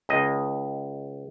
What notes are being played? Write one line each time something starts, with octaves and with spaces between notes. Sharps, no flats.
C#2 D#5